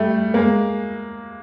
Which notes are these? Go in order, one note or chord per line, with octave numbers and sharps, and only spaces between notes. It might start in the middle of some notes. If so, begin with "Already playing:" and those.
Already playing: G3 A3
G#3 A#3